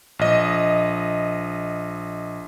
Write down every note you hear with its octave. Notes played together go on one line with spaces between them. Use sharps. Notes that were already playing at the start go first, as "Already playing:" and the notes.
A#1 D#5